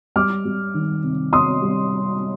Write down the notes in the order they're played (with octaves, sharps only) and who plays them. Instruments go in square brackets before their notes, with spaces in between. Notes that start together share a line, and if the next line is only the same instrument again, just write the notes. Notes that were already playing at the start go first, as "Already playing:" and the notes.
[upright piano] G3 D6 F6
G3
D#3
C3
C3 C6 D#6
G3